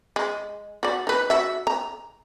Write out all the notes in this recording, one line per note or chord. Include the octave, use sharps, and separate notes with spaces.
G#3
F#4 D5
D#4 B4
F#4 E5
A#5